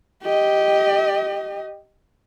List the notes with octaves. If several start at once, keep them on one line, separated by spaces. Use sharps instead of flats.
G4 D#5